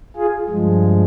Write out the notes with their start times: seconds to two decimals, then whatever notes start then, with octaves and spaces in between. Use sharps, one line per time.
0.16 F4 G#4
0.49 G2 F3 G#3